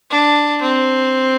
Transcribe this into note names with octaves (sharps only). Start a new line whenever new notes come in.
D4
C4